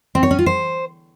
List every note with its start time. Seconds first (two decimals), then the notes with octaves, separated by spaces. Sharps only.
0.15 C4
0.23 C#5
0.31 C#4
0.39 F4
0.46 C5